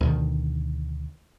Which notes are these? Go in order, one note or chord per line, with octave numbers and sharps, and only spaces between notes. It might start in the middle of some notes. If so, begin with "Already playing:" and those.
D2 B2 D#3